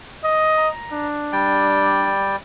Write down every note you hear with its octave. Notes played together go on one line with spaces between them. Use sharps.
D#5
A#5
D4
G3 D5 G5